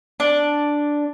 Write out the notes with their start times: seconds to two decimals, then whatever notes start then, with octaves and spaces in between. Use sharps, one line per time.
0.20 D4